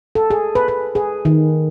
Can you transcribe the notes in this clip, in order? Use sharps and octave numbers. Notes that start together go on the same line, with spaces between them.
A4
G#4
B4
B4
G#4
D#3